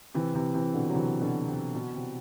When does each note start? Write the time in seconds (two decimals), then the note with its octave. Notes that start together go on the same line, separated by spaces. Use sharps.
0.14 C3 E3
0.34 C3 E3
0.54 C3 E3
0.74 B2 D3
0.89 F#3
0.94 C3 E3
1.21 B2 D3
1.48 C3
1.75 B2
1.95 C3